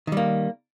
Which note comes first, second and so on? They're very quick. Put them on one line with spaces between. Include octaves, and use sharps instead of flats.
D#3 G3 A#3